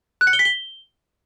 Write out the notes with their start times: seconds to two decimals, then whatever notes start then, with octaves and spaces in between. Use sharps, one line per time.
0.21 F#6
0.27 C#7
0.33 G7
0.39 B6
0.45 G7